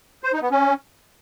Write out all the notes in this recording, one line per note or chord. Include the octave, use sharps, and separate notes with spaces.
C5
D#4
B3
C#4